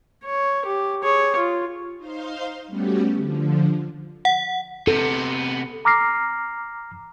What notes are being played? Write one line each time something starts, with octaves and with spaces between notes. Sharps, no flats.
C#5
G4
G#4 C#5
F4
D#4 C5 F5 C6
G3 A3 B3 C#4 F#4 G4
D3 F3
F#5
C3 B3 A4
A#5 D6 F6 A#6 C7